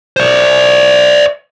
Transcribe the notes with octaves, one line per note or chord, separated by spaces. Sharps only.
C5 D5